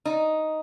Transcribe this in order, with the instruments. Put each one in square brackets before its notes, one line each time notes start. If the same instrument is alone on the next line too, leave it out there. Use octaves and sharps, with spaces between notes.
[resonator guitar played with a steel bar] D#4